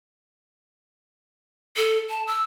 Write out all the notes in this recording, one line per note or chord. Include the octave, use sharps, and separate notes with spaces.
A4
A5
E6